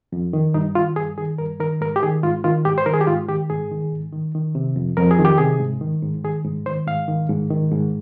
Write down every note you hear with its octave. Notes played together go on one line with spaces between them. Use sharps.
F2
D#3
G2 D#4
D#3 F4
G2 G#4
D#3 G#4
G2 A#4
D#3 A#4
G#2 A#4
G4
D#3 G#4
G#2 F4
D#3 F4
G#2 G4
C5
D#3 A#4
G#4
G4
G#2 F4
D#3 G4
G#2 G#4
D#3
G#2
D#3
D#3
C3
F2
F2 A#4
G#4
D#3
G4
C3 G#4
G#2
D#3
G#2
D#3 G#4
G#2
D#3 C5
G#2 F5
D#3
G#2
D#3
G#2